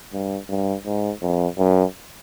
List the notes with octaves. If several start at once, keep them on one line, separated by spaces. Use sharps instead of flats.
G2
G2
G#2
F2
F#2